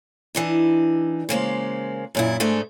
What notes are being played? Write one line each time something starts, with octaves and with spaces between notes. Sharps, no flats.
E3 D4 D#4
C#3 G#3 A#3 C5
F#2 A#2 E4
G#2 G#3 A3 D4